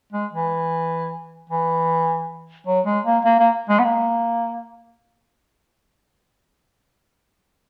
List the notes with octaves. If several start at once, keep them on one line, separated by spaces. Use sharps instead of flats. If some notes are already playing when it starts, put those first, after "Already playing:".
G#3
E3
E3
F#3
G#3
A#3
A#3
A#3
G#3
B3
A#3